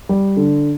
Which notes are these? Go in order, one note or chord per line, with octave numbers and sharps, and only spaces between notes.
G3
D3